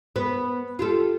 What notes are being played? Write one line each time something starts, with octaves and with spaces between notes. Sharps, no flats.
B3 B4
F4 G4 A4